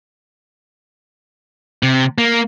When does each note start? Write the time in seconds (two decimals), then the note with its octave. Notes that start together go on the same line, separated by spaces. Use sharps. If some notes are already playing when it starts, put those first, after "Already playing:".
1.83 C3
2.18 A#3